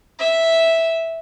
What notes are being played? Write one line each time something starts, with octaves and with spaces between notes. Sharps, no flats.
E5